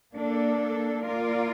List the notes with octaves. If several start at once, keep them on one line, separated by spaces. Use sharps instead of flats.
A#3 D4 A4
A#3 F4 A#4 D5